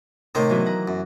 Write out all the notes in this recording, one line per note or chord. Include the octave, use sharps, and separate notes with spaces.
A2 C3 D#3 A#3 C5
E3 F#3 B3
F#5 A#5
F#2